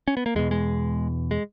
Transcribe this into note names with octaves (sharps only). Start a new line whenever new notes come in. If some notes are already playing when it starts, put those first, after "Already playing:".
C#4
B3
A#3
E2 B2 G#3
G#3
G#3